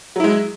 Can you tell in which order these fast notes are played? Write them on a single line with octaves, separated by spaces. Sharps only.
F#3 E4 G#3